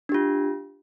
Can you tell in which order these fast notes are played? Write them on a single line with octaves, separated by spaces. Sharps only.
D4 G4 F4